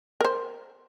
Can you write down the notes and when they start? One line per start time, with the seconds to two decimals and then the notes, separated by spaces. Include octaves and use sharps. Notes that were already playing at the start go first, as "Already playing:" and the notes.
0.21 A#4 C5